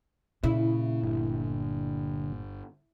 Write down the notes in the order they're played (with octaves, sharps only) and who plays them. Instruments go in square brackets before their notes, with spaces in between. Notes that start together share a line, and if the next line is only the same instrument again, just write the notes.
[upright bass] A#2 [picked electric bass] C#3 [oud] E4
[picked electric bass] G1 [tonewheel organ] D3